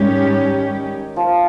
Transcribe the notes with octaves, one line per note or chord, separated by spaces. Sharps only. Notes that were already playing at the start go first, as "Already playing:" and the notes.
Already playing: G#2 D#3 G3 C#4 G4
F3 A#3 F4